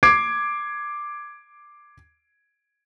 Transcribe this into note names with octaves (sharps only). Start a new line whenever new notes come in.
D6 G#6 C7 D7